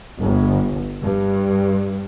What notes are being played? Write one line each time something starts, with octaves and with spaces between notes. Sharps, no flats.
G1
G2